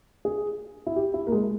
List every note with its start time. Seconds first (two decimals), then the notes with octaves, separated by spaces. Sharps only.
0.25 G#4
0.86 E4
0.96 G4
1.14 E4
1.27 A#3
1.32 G#3